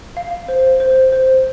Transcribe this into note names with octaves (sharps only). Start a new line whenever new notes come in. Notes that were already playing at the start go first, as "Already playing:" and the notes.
F5
C5
C5
C5